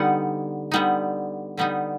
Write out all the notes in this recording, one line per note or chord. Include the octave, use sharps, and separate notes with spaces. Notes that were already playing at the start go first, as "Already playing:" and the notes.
Already playing: D3 G3 B3 D#4 F#5
D3 G3 B3 D#4
D3 G3 B3 D#4